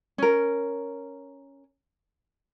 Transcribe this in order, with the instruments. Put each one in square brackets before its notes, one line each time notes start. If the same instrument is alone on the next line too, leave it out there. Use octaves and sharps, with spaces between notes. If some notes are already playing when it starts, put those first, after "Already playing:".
[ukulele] C#4 A#4